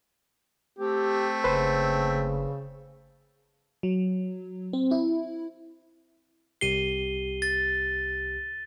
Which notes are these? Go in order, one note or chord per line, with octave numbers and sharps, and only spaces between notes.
A3 C4 G4
F#1 C#3 B4 C5
F#3
C4
E4
C2 G4 C7 D#7 G7
A6